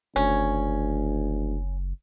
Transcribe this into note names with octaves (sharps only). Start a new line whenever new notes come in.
F#1 D2 C#4